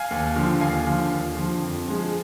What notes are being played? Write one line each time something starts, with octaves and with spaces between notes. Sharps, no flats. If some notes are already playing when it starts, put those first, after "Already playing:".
Already playing: F5 G#5
D#2
D3 F3
D#2 F5 G#5
D3 F3
D#2
D3 F3
F2
F3 G#3